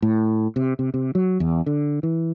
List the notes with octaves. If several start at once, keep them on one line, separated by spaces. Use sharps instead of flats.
A2
C3
C3
C3
F#3
E2
D3
E3